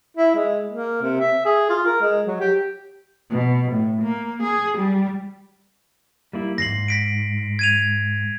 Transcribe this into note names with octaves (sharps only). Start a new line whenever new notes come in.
E4
G#3
A#3
C3
E5
G#4
F4
A#4
G#3
F#3
G4
B2
A2
A#3
G#4
G3
G3 A#3 E4
E2 G#2 A#6 C7 F#7
A#6 B6 D7
G#6 D#7 F7